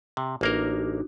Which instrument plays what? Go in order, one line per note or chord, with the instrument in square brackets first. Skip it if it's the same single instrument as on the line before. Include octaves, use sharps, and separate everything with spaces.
[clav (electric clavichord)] C3
[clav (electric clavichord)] A1 A#3 A#4 [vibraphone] D4 D#4 F#4